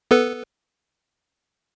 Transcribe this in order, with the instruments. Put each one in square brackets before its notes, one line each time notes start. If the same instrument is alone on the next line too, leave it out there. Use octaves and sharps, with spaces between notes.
[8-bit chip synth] B3 A4 B4